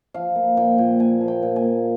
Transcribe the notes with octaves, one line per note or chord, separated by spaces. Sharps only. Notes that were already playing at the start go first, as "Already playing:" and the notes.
F3 F5
A#3
A#2 G5
A#2
A#2 G#5
F3
G5
A#2
G#5
A#2